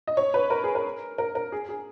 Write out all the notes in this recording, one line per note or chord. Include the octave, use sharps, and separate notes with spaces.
D#5
C#5
B4
A#4
G#4
A#4
A#4
A#4
G#4
G#4